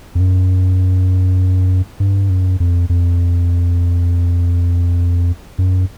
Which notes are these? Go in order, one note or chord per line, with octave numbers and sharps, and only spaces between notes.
F2
F#2
G2
F#2
F2
F2
F#2